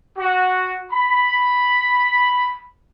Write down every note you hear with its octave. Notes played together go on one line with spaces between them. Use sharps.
F#4
B5